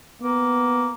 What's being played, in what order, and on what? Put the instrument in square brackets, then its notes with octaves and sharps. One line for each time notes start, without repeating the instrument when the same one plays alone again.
[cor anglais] A#3 [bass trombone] B3